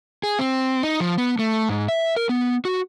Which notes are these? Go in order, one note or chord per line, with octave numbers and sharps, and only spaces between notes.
G#4
C4
D#4
F3
B3
A3
G#2
E5
A#4
B3
F#4